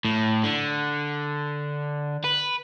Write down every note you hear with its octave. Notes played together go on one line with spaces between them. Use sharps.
A2
D3
B4